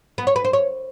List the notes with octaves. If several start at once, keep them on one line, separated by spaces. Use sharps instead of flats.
B3
C#5
B4
C5
C#5